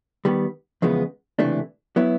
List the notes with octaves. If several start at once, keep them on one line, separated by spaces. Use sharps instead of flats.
D#3 G3 B3
E2 C#3 F3 G#3 B3
C#2 C3 E3 A3 D4
F#3 B3 E4